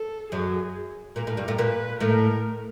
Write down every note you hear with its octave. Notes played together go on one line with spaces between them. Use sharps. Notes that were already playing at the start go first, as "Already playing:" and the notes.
Already playing: A4
F#2 F#3 G#4
A#2 A#3 A#4
A2 A3
G2 G3
A2 A3
A#2 A#3 B4
A2 A3 A#4